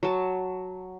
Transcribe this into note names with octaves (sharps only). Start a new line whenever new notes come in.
F#3 A5